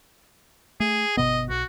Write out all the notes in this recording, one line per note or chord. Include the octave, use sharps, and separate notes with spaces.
A3 G#4
G1 B2 B3 D#5
B1 F#4